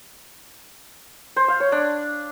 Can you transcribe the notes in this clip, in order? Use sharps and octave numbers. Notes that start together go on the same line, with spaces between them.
C5
F5
C#5
D4